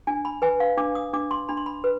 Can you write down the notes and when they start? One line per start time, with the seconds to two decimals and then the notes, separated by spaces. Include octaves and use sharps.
0.07 D4 G#5
0.25 B5
0.42 B4 G#5
0.60 F5
0.77 D4 D6
0.95 D#6
1.13 D4 D6
1.31 C6
1.49 D4 B5
1.57 C6
1.66 B5
1.84 B4